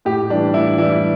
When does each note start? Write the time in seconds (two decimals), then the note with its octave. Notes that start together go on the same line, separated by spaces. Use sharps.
0.05 A2 G4
0.30 E3 G3 D4
0.54 A2 E4
0.78 E3 E4
0.81 G3